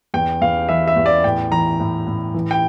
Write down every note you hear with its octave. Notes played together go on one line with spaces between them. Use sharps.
E2 G5
E2 F5
E3 E5
E5
E2
D5
A2 G5
E3 A#5
A2
A2
E3
G5